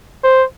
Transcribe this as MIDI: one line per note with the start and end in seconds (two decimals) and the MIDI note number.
0.24 0.44 72